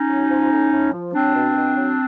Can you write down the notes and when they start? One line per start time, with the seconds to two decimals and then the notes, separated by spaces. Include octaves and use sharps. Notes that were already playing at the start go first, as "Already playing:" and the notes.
Already playing: C#4 D#4
0.08 F#3
0.29 F3
0.50 A2
0.71 A2
0.92 F3
1.12 F#3 C4 D4
1.34 B2
1.55 B2
1.75 F#3